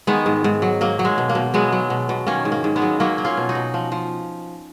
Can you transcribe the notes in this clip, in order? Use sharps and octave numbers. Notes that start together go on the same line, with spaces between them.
D#3 G#3 B3
G#2
G#2
F#3
F#3 A#3
F#3
G#3
B2
A#3
B2
F#3 G#3 B3
F#3
B2
B2
D#3 A#3 C#4
G#2
A#3
G#2
G#3 B3
F#3
F#3 A#3 C#4
F#3
C#4 F4
B2
D#4 F#4
B2
F3
F3